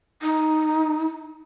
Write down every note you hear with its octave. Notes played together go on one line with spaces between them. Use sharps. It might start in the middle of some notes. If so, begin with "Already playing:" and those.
D#4